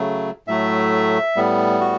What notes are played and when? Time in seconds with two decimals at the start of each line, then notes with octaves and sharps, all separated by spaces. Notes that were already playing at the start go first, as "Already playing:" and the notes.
Already playing: C#3 F#3 A3
0.48 A2 F#3 A3 E5
1.36 A2 G3 B3
1.80 F#4